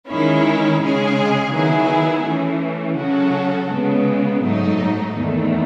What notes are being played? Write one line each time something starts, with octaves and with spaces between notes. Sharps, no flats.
D#3 G#3 C#4 E4
C#3 G#3 C#4 G#4
D#3 F#3 B3 E4 G#4
E3 A3 C#4
C#3 F#3 C#4 F#4 A4
C#3 G#3 B3
G#2 F#3 A3 D#4
E2 D#3 A3